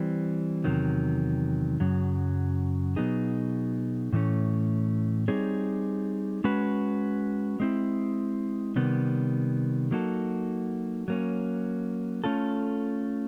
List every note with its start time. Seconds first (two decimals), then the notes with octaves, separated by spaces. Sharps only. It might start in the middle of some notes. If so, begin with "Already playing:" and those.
Already playing: E3 G3 C4
0.64 E2 C3 D#3 F#3
1.80 F#2 C#3 F#3
2.96 B2 F#3 B3 D#4 G#4
4.13 A2 E3 A3 C#4
5.28 G3 C4 D#4 G#4 C#5
6.44 G#3 C#4 F#4 B4
7.60 G#3 C4 E4
8.76 C3 D#3 G3 B3
9.91 F#3 A#3 D#4 F#4 A4
11.08 F#3 A#3 C#4
12.24 A3 C#4 F4 A4